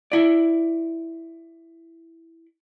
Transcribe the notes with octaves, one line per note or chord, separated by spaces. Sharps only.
E4 D5